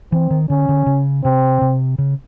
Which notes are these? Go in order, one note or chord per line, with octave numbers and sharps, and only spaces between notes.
E3 C4
D#3
D3 C#4
D3
C#3
C3 C4
C3
C#3